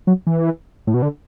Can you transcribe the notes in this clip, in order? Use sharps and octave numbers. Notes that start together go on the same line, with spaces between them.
F#3
E3
A2
B2
D3